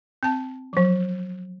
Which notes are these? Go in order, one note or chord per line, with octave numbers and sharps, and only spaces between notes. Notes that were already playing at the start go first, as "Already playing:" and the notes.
C4 A5
F3 F#3